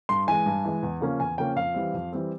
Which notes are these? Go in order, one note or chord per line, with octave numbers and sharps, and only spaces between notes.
G2 C6
E3 G#3 G#5
G2
E3 G#3
E2
C#3 F3 A#3 C#4
E2 G#5
C#3 F3 A#3 C#4 G5
F2 F5
E3 G3 C4
F2
E3 G3 C4